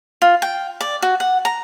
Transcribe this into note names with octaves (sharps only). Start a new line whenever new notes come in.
F4
G5
D5
F#4
F#5
A#5